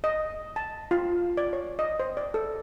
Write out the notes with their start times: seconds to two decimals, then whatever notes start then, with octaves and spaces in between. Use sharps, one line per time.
0.04 D#5
0.56 A5
0.91 F4
1.37 D5
1.53 C#5
1.79 D#5
2.00 C5
2.17 D5
2.34 A4